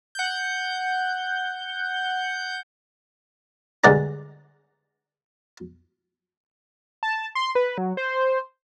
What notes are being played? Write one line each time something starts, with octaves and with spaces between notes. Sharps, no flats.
F#5 G6
D2 G2 G#3 D5 F#5 A#5
A5
C6
B4
F#3
C5